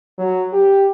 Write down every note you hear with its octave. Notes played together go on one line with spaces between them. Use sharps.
F#3
G4